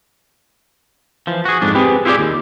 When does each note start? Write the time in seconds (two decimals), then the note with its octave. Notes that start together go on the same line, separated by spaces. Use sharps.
1.27 E3 F3
1.45 F#4 G#4
1.62 F2 G#2 D4
1.75 B3 C4 G4 G#4 B4
2.05 E4 F4 G4 G#4 D5
2.19 D#2